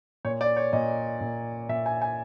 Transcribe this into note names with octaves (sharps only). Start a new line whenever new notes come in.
A#2 C#5
D5
C#5
A#2 D#5
A#2
A#2 E5
G#5
G#5